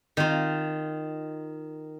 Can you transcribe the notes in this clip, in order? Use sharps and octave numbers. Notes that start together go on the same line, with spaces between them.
D#3 F4